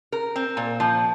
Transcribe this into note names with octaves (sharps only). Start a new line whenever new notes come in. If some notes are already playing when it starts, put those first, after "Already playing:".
A#4
C4
A#2
F3